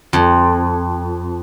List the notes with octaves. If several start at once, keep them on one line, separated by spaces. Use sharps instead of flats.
F2